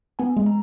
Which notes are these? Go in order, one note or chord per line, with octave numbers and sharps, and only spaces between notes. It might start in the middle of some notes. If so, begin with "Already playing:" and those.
B3 G#5
G#3
A#5